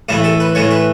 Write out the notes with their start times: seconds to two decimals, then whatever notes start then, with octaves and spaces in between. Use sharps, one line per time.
0.09 A2 E3 A3 E4
0.24 A4
0.40 B4
0.55 A2 E3 A3 C#5
0.71 B4